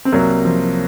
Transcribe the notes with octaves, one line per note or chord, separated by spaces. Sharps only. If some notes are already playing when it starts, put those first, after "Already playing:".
C4
C2 F#3 A#3
F3